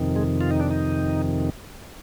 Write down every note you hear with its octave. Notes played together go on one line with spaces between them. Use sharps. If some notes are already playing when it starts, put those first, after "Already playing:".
Already playing: F2 C3 D#3
G#3
F4
D#4
D4
D#4